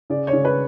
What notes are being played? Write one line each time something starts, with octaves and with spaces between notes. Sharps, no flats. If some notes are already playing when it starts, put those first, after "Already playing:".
C#3 D5
C#5
C#3
B4